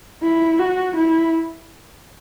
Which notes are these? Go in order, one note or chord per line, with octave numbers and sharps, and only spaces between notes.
E4
F#4
E4